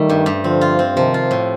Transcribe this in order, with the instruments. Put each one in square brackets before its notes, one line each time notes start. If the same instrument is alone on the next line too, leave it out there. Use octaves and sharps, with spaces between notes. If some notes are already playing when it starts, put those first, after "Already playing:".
Already playing: [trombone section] D#3 G3 [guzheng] A3
[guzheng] G2
G2
[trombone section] D3 F3 [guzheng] C4
[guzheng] F4
C4
[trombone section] C3 D#3 [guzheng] F3
[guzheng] F4
A2